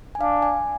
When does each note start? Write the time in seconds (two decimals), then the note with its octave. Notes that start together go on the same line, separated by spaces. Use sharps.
0.15 G#5
0.21 D4 F5
0.42 G#5